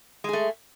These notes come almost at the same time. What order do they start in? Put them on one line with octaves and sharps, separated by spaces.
G#3 G#4 A3